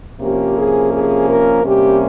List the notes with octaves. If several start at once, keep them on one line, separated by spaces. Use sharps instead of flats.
C3 F3 A#3 C#4 G4
G#4
G#4
A#4
C3 G3 A#3 C#4 G4